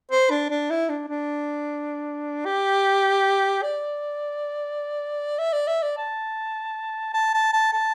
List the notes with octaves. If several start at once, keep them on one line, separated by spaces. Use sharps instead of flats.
C5
D4
D4
E4
D4
D4
G4
D5
E5
D5
E5
D5
A5
A5
A5
A5
A5